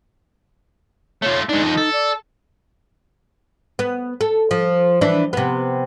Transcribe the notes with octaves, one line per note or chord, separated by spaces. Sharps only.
A3 F4 C#5
G#3 D4 D#4
F3 D#5
A4
D5
B3
A4
F3
E3 D4
C3 B3